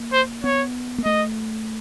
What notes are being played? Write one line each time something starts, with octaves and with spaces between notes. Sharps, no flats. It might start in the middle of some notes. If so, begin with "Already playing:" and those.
Already playing: A#3
C5
B3 C#5
A#3
A3 D#5